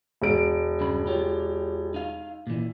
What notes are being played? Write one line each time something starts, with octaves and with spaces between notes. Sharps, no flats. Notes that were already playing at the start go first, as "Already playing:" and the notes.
E1 D7
G2 C#3 B5
F4 G4 C#5
D#4 F5
A#2 E3